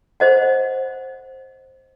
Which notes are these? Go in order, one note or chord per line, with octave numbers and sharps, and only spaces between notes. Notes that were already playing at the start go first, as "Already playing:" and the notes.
C5 D#5 F#5